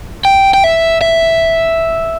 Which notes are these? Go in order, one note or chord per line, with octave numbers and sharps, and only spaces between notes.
G5
G5
E5
E5